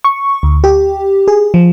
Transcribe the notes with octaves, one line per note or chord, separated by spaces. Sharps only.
C#6
D2
G4
G#4
F3